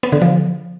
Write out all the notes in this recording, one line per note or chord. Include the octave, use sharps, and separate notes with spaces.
B3
D3
F3